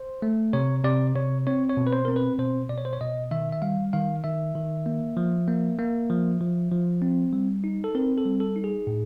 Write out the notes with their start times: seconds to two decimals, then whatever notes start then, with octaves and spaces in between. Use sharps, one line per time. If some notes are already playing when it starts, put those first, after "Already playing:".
Already playing: C5
0.22 A3
0.53 C3 C#5
0.84 C3 D5
1.15 C3 C#5
1.47 C4 C#5
1.69 C#5
1.77 B2
1.87 B4
1.93 C5
2.05 C4 A#4
2.16 B4
2.38 B2 C5
2.69 B2 D5
2.78 C#5
2.85 C5
2.93 C#5
3.01 B2 D#5
3.31 D#3 E5
3.52 E5
3.62 G3 F5
3.93 D#3 F5
4.24 D#3 E5
4.55 D#3
4.86 A#3
5.17 F3
5.48 A#3
5.79 A#3
6.10 F3
6.41 F3
6.72 F3
7.02 C4
7.33 G3
7.64 D#4
7.84 A4
7.95 C4 A#4
8.18 A4
8.25 G3
8.40 A4
8.56 D#4
8.64 G#4
8.87 A2